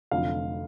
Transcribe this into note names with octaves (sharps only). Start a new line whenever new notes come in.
F1 F2 D3 F#3 A3 F5